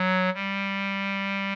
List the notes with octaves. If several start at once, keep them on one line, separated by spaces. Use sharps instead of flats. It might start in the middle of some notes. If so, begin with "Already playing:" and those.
Already playing: F#3
G3